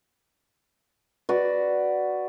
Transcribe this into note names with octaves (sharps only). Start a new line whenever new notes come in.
F#4 B4 D5